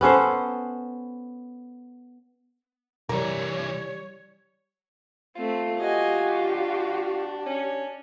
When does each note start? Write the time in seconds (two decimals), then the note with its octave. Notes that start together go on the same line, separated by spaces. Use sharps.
0.01 B3 C#4 A4 C5
3.09 C2 E3 G3 A#4 C#5 D5
5.36 A3 C4 F4
5.79 F#4 G4 D#5 G#5
6.42 D4
7.46 C#4